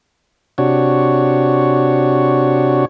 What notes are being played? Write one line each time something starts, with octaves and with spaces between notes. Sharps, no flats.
C3 D4 F#4 C#5